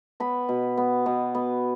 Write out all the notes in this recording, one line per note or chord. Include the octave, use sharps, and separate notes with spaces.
B3 B5
B2
B3
B2
B3